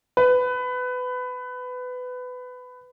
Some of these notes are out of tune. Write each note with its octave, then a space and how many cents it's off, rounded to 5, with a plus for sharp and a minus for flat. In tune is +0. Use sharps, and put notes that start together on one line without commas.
B4 +20